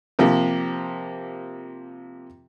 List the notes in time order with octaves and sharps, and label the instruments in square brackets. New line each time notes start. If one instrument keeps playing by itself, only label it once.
[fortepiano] C3 F3 A#3 G4